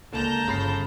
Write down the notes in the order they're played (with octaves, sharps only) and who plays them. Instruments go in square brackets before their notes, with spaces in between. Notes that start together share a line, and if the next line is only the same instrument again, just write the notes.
[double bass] C#2 [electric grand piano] D3 A#3 [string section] A5 A#5 G6
[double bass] G1 [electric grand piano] C#3 B5 C7